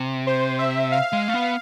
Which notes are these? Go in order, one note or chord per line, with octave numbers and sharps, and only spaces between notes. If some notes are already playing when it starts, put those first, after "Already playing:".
Already playing: C3
C5
E5
F5
G#3
A3
B3